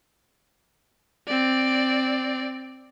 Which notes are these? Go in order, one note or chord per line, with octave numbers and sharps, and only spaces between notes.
C4 D5